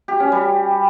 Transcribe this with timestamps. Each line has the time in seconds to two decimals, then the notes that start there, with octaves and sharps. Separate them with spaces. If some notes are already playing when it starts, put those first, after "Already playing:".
0.08 G4
0.20 C#4
0.32 G3